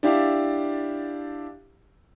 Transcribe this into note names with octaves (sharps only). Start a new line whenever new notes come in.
D4 E4 G4 D5 E5 F5